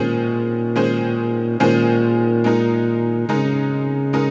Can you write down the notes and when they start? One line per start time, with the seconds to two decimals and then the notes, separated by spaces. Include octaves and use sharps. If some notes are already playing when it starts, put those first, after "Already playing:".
Already playing: A#2 D#3 G#3 C#4 G#4 C5
0.76 D#3 G#3 C#4 G#4 C5
1.60 A#2 D#3 G#3 C#4 G#4 C5
2.44 G#3 D#4 A#4
3.29 C#3 G#3 D#4 A#4
4.13 G#3 D#4 A#4